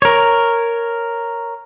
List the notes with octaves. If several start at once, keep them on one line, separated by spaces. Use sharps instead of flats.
A#4 C#5